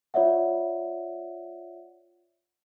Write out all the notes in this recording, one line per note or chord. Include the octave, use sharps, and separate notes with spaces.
F4 C#5 D5 E5 F#5